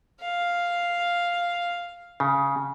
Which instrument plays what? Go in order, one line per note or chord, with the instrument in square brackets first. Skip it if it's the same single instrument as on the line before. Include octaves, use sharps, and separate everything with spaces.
[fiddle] F5
[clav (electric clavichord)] C#3